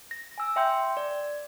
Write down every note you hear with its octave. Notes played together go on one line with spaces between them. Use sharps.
A#6
G#5 E6
E5 G5 C6 G6
D5